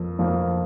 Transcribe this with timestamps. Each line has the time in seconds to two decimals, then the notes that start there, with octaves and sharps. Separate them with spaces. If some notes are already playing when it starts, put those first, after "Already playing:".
Already playing: F2 F3 A#3
0.19 F2 F3 A#3